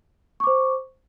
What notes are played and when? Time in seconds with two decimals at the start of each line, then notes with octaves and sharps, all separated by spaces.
0.40 C#6
0.44 D6
0.47 C5